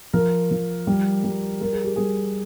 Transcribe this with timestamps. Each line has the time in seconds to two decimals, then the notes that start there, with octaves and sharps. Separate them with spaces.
0.14 F3 A#4
0.51 F3
0.87 G3
1.24 G3
1.61 G3 A#4
1.73 G#4
1.84 G4
1.96 G3 G#4